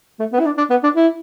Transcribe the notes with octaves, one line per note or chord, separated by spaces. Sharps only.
A3
B3
E4
D4
D4
B3
D4
E4